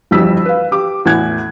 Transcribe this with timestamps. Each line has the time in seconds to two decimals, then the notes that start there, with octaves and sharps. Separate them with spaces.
0.11 G1 F2 E3 G4 E6 B6
0.45 B4 F5
0.71 G4 D6
1.05 E2 A2 F#6 G#6